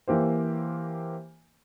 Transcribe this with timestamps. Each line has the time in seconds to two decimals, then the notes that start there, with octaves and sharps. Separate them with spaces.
0.08 E3 A#3 G4 C5